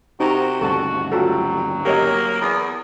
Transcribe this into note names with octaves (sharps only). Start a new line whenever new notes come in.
C3 D#4 F#4 A#5
D2 G2 C#3 F#4 A4 A5
F#3 G3 F4 F#4 A4
A#3 G4 C#5 D#5
E2